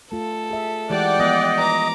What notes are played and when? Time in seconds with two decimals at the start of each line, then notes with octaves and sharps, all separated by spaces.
0.12 A3 F4 A4
0.51 G#4 E5
0.90 E3 G#3 G4 D5 F#5 G5
1.19 F3 G#3 B3 D#5
1.59 B4 A#5 D6